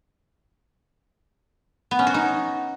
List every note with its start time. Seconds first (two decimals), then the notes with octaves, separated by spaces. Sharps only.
1.91 B3
1.99 C#4
2.07 F#4
2.14 D#4